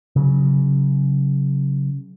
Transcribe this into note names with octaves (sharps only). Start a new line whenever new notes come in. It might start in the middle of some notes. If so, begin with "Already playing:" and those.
C#3 F#3